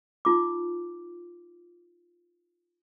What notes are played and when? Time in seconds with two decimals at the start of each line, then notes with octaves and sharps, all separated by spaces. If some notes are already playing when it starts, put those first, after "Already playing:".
0.25 D#4 F4 D6